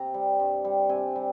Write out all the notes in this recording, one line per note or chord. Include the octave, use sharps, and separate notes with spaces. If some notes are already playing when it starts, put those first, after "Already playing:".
Already playing: C3 A#5
G3
G2
G3
C3 G#5
G3